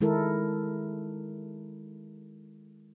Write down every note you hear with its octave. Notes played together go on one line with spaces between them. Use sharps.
D#3 G#3 E4 A4 A#4